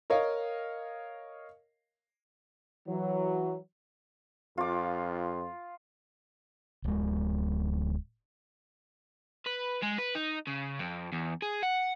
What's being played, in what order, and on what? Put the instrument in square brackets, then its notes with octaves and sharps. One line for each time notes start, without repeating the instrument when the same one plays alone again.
[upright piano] A#4 C#5 D#5 F5
[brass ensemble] E3 F#3
[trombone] F2 [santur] F4 D6
[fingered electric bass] D1 G#3
[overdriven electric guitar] B4
G#3
B4
D#4
C#3
F2
E2
G#4
F#5